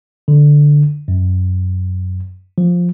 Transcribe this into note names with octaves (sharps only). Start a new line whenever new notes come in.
D3
F#2
F3